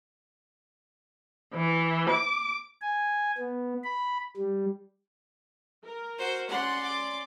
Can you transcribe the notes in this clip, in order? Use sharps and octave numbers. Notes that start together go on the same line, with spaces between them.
E3
D6
G#5
B3
B5
G3
A#4
F#4 C5
C#4 D5 F#5 C6
D6